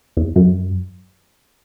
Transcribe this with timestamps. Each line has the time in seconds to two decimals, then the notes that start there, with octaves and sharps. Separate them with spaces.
0.17 E2
0.36 F#2